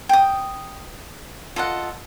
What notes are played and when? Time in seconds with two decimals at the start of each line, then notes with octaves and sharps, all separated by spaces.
0.09 G5 D#6
1.56 F4 A4 D#5 F#5